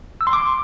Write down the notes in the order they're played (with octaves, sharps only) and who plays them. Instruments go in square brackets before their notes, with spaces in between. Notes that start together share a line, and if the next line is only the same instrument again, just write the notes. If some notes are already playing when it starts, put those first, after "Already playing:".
[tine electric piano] E6
C6
D6